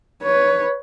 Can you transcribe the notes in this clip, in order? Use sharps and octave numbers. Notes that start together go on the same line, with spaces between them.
B4 C#5